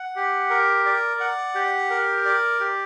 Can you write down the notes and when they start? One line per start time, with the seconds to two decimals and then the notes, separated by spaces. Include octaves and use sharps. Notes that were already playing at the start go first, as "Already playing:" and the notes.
Already playing: F#5
0.16 G4
0.50 A#4
0.86 D5
1.20 F#5
1.55 G4
1.90 A#4
2.25 D5
2.60 G4